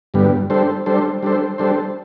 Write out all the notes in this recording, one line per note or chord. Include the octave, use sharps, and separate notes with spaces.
G2 D3 G3 B3
G3 D4 A4 C5
G3 D4 A4 C5
G3 D4 A4 C5
G3 D4 A4 C5